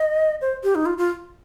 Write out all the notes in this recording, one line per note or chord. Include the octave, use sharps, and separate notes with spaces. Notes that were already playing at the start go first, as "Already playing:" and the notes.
Already playing: D#5
C5
G4
D#4
F4
F4